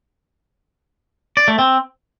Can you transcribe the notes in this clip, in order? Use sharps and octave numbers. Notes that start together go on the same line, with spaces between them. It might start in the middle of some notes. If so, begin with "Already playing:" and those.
D5
A3
C4